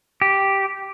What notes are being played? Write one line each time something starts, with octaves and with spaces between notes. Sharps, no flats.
G4